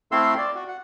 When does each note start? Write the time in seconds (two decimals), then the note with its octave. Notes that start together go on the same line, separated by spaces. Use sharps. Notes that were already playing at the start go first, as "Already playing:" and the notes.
0.12 A3 C4 E4 F5 C6 E6
0.38 D5
0.55 F#4
0.68 F#5